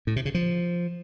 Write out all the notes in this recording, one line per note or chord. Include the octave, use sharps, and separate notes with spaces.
A2
C3
C#3
F3